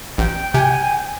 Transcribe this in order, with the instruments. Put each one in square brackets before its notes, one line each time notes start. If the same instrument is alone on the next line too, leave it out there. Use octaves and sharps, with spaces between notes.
[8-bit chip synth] A1 [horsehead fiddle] G5
[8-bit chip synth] C3 [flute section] G#5